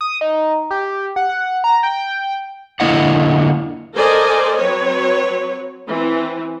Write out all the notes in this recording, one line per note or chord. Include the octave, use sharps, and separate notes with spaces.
D#6
D#4
G4
F#5
F#5
A#5
G5
D3 A#3 E4 D#5 F#5
A4 A#4 C5 D5 D#5 G#5
F#3 C4 B4 C#5
E3 C4